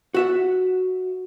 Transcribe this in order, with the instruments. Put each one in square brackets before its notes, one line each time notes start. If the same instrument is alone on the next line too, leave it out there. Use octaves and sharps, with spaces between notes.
[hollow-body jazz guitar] F#4 E5 F#5